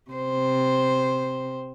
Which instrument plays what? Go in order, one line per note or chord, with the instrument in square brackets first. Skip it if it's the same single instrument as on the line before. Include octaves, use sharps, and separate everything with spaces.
[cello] C3 C5